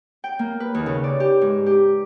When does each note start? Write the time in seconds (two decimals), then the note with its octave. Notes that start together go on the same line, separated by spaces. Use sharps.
0.24 G5
0.39 A#3
0.60 B4
0.74 D#2
0.86 C#3
1.04 D5
1.20 G4
1.41 G#2
1.66 G4